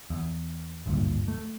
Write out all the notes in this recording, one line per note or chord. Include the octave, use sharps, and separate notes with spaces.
E2
G#1 D2 G2 A#2
A3